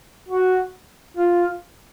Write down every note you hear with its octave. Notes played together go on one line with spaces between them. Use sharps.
F#4
F4